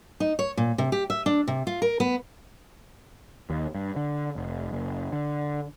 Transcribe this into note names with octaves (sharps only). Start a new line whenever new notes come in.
D#4
C#5
A#2
C3
G4
E5
D4
C3
F4
A#4
B3
D#2
G2
D3
F1
F#1
D3